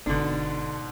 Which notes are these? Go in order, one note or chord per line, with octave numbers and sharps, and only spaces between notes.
G1 G#2 B2 D3 D4